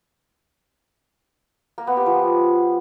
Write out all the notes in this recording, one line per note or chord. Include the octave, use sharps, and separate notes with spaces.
A#3
B3
G4
F3